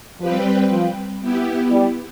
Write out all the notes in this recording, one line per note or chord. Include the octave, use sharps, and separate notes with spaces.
F3 G3 C4 G4 B4
F3
B3 E4 G4
G3